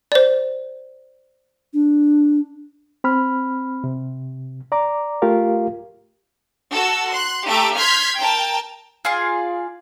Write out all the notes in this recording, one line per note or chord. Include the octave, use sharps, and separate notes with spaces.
C5 D5
D4
C4 B5 F6
C3
D5 A#5 D6
A3 F4 G4 A#4 F5
F#4 A4 E6
C6 F#6
A3 G4 E5 A#5 D7
C6 F6 G6 G#6 B6
A#4 G5 A5
F4 G#4 D5 F5